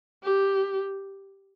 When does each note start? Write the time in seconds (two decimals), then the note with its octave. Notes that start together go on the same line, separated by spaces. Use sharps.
0.23 G4